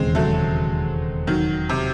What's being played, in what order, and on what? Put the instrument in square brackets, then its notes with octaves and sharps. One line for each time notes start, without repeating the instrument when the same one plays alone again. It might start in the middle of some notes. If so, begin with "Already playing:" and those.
Already playing: [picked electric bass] E1 D#2 C#3 E3 [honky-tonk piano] G#3 C4
[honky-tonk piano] F#3 A3
D#3 F#3
C3